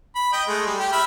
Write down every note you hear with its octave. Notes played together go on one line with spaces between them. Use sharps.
B5
D#5 G5
G#3 A3
G3
G4
E5 B5 F6